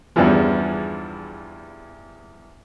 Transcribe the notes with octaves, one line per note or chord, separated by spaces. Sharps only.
E2 G2 C#3 E3 F3